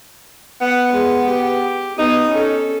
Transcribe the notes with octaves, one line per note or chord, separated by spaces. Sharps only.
B3 F#5
G#3
G4
B3 D#4 D#6
C#4 A4